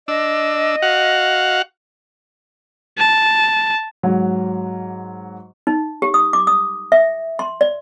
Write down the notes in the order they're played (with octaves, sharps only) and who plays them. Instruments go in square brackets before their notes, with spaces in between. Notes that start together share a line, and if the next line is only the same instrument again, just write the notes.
[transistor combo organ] D4 E6 [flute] D#5
[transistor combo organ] F#4 F5 F#5
[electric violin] A5
[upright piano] G#2 F#3
[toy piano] D#4
G4
D#6
D6
D#6
E5
C6
D5